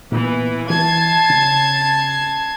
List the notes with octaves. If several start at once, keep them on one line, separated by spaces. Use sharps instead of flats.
A#2 E3 B3
E3 A5 G#6 C7
C#3